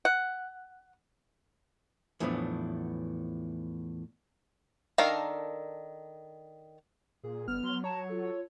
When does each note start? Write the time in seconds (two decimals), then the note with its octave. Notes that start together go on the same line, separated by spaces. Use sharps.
0.05 F#5
2.20 E2 A2 F3 F#3 B3 D4
4.98 D#3 D4 A4 A#4 F5
7.23 A#2 G#4
7.48 G1 B3 F6
7.63 F#3 C6
7.84 C#5 A5 A#5
8.09 F4 A4